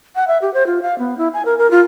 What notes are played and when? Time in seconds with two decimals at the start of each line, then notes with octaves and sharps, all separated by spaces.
0.16 F#5
0.27 E5
0.42 G4
0.54 C5
0.67 F4
0.82 F5
0.99 B3
1.18 E4
1.34 G#5
1.45 A#4
1.58 A#4
1.71 F4